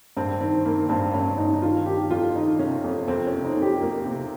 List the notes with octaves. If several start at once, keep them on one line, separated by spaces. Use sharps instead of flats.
G2 C4
D#3 C4
D#3 A#3
G2 C4
G2 C#4
G2 D#4
D#4
D#3 F4
D#3 G4
F2 F4
D#3 D#4
C3 C#4
F2
F2 C4
C#4
C3
D#4
F2
G4
F2 A#3
C3